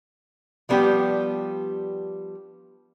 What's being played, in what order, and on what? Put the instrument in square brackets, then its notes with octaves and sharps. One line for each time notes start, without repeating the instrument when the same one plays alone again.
[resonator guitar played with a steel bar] F3 G3 B3 D4 G4